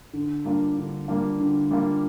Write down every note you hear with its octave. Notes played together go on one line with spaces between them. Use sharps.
D3
G3 A#3 D4 F4
D3
G3 A#3 D4 F4
D3
G3 A#3 D4 F4